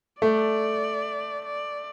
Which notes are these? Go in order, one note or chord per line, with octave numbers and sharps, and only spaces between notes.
A3 D5
D5